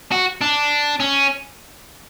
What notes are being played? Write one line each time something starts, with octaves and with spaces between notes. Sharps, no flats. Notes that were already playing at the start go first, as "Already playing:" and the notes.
F#4
D4
C#4